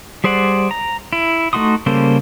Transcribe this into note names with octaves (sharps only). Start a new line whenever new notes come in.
G3 G#4 C5 D5 F#5
A#5
E4
A3 D#4 F#4 C6 D#6
C#3 G3 A#3 A4 C5